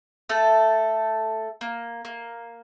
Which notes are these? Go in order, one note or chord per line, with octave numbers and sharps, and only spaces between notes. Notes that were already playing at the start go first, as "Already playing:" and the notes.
A3 A4
A#3
A#3